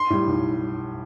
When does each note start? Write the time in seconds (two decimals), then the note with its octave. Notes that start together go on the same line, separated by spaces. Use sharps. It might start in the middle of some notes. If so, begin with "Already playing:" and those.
Already playing: C6
0.10 A2 G3
0.27 B1